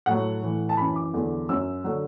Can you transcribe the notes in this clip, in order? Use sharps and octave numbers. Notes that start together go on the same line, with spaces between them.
A2 F#3 F#5
A2 E3
A5
F#2 E3 B5
D6
E2 D3 F#3
F#2 F#3 E6
D3 F#3